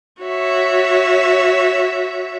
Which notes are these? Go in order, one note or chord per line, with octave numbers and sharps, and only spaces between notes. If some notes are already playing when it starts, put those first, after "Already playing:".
F#4 C#5 E5